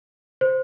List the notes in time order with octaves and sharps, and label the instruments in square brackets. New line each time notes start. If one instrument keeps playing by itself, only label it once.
[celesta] C5